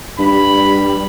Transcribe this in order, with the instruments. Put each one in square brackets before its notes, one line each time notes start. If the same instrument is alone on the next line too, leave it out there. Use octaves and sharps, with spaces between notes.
[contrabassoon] G2 [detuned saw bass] G3 [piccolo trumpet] B5